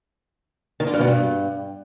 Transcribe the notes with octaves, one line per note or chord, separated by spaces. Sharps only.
D#3
D3
G2
B2
G2